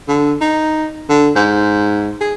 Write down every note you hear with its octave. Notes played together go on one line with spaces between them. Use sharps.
D3
D#4
D3
G#2
G#4